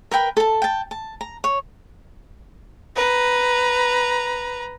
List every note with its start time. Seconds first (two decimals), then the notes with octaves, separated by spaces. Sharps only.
0.11 A#4 B4 G5 B5
0.37 A4 A5
0.62 G5 A5
0.91 A5
1.21 A#5
1.44 C#5
2.96 B4 A#5